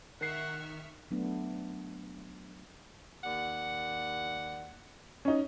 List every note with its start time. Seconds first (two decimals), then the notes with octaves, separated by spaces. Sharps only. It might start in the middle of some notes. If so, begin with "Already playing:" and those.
0.21 D#3 A#4 E5 F#5 C#6 F6 C7
1.11 F#3 A3 B3 D4
3.23 D#2 D5 F#5
5.25 C#4 D#4